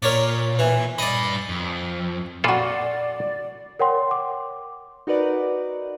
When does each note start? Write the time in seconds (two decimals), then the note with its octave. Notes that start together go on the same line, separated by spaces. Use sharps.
0.02 A#2 A#4 C#5 D5
0.59 E3
0.98 G2 D5 D#5 B5
1.49 F2
2.44 A#2 F4 F#4 A4 D5 B5
3.79 A#4 C#5 F#5 G5 C6
4.11 D6
5.07 D#4 F#4 A#4 B4 D5